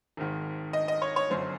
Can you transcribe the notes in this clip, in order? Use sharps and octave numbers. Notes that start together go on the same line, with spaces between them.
G#1 G#2 D#3
D#5
D#5
C#5
C#5
G1 F#2 D3 C5